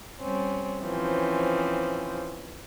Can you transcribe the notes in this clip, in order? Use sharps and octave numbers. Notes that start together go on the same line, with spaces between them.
G3 C4 C#4
E3 F3 C4 C#4